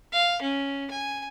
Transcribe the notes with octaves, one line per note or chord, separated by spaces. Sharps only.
F5
C#4
G#5